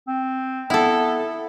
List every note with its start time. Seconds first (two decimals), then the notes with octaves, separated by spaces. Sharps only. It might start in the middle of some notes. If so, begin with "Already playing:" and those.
0.08 C4
0.70 B3 E4 A4